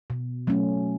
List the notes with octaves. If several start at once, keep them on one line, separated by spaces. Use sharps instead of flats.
B2
F#3 A3 C#4